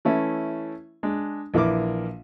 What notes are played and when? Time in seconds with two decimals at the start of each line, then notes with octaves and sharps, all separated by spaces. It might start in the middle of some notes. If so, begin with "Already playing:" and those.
0.05 E3 A3 C#4 E4
1.03 G#3 D4
1.54 A#1 E3 E4 A#4 D6